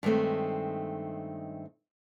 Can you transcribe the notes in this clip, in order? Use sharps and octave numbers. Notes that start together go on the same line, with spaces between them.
G2 D#3 G#3 A3 C4